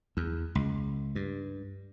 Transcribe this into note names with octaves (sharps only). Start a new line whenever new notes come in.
E2
C#2
G2